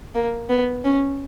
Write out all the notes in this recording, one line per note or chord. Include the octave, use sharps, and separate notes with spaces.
A#3
B3
C#4